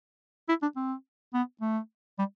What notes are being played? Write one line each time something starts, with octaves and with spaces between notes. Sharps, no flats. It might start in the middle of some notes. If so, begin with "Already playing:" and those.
E4
D4
C4
B3
A3
G3